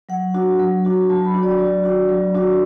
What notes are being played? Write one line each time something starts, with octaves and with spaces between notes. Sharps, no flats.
F#3 F#5
D4 F#4
F#3
D4 F#4
F#3 A5
B5
D4 F#4
D5
F#3 D5
D4 F#4
F#3
D4 F#4